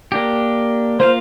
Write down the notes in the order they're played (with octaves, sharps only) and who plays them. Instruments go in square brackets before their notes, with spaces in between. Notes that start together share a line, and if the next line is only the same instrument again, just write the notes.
[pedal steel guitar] A#3 D4 G4
[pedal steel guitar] A#3 F4 F5 [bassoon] C5